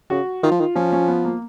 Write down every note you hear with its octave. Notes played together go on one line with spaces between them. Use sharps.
C#3 F#4
D#3 F4
F3
D#3
F3 C#4
C#4
B3
A#3